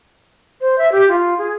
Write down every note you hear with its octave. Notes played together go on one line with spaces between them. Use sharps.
C5
E5
G4
F4
G#4